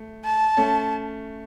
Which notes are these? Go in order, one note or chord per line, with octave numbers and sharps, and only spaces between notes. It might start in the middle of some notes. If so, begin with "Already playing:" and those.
Already playing: A3
A5
A3 C#4